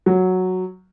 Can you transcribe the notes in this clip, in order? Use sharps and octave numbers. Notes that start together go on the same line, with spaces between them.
F#3